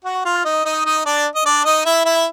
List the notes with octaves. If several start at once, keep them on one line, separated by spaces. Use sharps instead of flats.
F#4 F#5
F4 F5
D#4 D#5
D#4 D#5
D#4 D#5
D4 D5
D#5
D4 D5
D#4 D#5
E4 E5
E4 E5